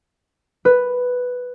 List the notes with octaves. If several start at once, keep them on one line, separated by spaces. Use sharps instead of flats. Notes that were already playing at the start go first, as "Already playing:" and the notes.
B4